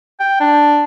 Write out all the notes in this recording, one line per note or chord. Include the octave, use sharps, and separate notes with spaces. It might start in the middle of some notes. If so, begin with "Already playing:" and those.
G5
D4